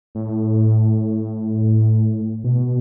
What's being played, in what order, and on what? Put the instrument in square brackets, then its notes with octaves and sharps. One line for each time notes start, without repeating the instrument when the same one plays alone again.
[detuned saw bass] A2
B2